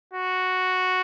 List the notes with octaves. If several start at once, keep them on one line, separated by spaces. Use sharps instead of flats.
F#4